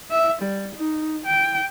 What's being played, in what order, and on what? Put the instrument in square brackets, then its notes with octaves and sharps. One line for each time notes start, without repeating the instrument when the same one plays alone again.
[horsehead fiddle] E5
G3
D#4
G5